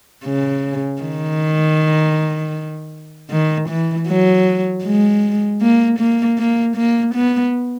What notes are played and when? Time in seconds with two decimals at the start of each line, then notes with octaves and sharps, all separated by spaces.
0.24 C#3
1.02 D#3
3.31 D#3
3.69 E3
4.08 F#3
4.85 G#3
5.62 A#3
5.99 A#3
6.38 A#3
6.76 A#3
7.15 B3